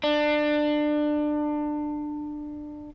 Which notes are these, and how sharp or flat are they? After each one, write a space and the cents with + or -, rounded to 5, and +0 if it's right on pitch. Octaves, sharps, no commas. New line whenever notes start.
D4 +25